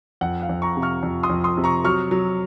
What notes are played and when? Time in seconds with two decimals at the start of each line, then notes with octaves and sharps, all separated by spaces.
0.21 F2 F#5
0.42 F5
0.49 F2
0.62 A#5 C#6
0.77 C3
0.82 C#6 F6
1.03 F2
1.23 C6 D#6
1.30 F2
1.44 C6 D#6
1.57 C3
1.64 A#5 C#6
1.85 F#3 C#6 F6
2.11 F#3